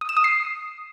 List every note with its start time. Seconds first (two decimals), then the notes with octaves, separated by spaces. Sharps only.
0.01 D#6
0.09 E7
0.17 D#6
0.24 C7